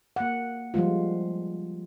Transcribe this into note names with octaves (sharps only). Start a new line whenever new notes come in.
A#3 F#5
F3 G3 G#3 F4